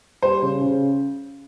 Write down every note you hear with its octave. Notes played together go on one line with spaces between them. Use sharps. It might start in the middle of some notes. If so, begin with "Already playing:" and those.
G3 C5
C#3
C#3